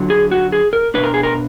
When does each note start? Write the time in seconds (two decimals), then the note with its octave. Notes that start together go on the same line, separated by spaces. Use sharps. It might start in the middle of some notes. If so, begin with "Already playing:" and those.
Already playing: D3 F#3 F4
0.10 G#4
0.31 F#4
0.52 G#4
0.73 A#4
0.94 B2 G#3 D4 B4
1.04 A#4
1.14 G#4
1.23 A#4